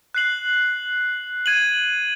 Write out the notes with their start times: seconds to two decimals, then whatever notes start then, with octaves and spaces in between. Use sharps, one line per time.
0.15 F#6 C7 F#7
1.46 G#6 D#7 F#7